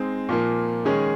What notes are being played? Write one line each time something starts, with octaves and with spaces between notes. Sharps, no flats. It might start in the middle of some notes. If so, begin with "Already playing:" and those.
Already playing: G#3 C4 D#4
A#2 F3 A#3
D#3 G#3 C#4 G#4